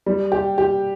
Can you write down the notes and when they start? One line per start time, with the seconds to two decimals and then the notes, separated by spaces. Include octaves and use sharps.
0.06 G3
0.32 G4
0.58 G4